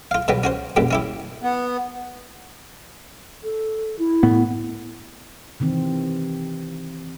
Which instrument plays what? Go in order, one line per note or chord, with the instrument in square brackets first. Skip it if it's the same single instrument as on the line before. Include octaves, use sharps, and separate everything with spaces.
[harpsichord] F4 F5
B2 F#3 G3 B3
C#4 F#4 C5
A#1 F#2 B2 G3
C#4 E4 G4
[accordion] B3
[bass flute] A4
E4
[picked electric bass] A2 B3
[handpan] C3 D#3 E3 C4